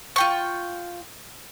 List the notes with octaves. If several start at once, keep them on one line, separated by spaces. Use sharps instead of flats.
F4 G5 C#6